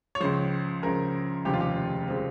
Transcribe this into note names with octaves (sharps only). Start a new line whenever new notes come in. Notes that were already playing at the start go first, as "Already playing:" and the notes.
C#5
C#2 C#3 F3 C5
C#2 C#3 F3 A#4
F1 D#2 C#3 F3 G#3 G4
F4
G4
C#3 F3 G#3 C4